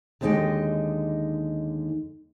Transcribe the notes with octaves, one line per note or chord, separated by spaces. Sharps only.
D#2 D3 G#3 D#4 D#5 G5